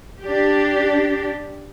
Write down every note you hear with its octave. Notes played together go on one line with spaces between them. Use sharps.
D4 G4